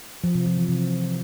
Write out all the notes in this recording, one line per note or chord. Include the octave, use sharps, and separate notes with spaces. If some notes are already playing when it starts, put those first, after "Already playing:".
F3
C3
F3
E3
C3